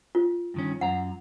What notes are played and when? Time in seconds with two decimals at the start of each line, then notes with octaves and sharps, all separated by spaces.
0.15 F4
0.54 G2 D#3 C#4
0.81 F#2 F#5 A#5